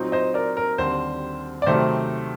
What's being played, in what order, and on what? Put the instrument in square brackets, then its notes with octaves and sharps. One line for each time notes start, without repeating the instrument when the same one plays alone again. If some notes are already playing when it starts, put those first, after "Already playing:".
Already playing: [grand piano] A#2 F#3 C4 D#4 F#4
[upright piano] C5 D#5
A#4 D5
A#4
[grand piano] D#2 D3 G3 C4 [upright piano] C5
[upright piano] D5
[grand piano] C3 D#3 F#3 A3 [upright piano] C5